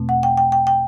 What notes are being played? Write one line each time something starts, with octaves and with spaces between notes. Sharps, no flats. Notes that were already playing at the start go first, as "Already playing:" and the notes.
Already playing: E2 B2 A3 C4
F#5
G5
G5
G5
G5